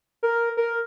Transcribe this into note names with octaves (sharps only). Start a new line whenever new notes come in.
A#4
A#4